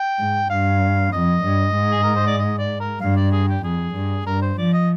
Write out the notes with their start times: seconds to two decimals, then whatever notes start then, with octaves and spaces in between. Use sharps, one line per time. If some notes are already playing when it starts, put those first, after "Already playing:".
Already playing: G5
0.19 G#2
0.50 G2 F5
1.13 F2 D#5
1.43 G2
1.75 G#2
1.91 G#4
2.03 A#4
2.15 C5
2.27 D5
2.38 D#5
2.59 D5
2.80 A#4
3.01 G2 F5
3.16 D5
3.32 G#4
3.48 G4
3.63 F2 G#4
3.94 G2
4.26 G2 A#4
4.42 C5
4.58 F3 D5
4.73 D#5